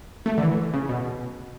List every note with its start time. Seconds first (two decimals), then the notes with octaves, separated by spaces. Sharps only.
0.26 A3
0.38 D3
0.43 E3
0.74 C#3
0.89 B2